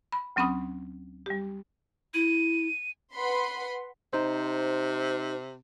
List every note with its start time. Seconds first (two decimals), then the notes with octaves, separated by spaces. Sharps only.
0.12 B5
0.36 D2 F#3 C4 C#4 B5 D#6
1.26 G3 G4
2.14 E4 D#7
3.13 B4 F#5 B5 C6
4.13 C3 D#4 C5